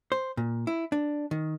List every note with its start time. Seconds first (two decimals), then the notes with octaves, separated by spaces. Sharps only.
0.12 C5
0.37 A#2
0.67 E4
0.92 D4
1.31 D#3